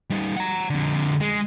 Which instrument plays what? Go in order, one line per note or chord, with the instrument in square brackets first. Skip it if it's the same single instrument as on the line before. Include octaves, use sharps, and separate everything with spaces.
[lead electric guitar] G3 D#4
F#5 A#5
F2 D3
G#3